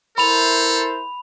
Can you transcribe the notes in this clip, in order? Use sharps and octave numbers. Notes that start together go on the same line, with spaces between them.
E4 A4 A#4 C5 B5 F7